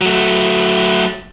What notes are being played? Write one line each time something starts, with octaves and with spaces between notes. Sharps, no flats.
F#3 A3